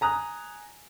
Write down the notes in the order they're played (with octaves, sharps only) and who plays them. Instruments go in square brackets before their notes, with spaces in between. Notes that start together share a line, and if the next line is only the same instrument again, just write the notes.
[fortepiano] G#5 A#5 D#6 F#6